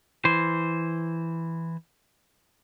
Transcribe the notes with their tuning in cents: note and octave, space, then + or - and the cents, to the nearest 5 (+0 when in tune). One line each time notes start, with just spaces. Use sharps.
E3 +0 C5 +0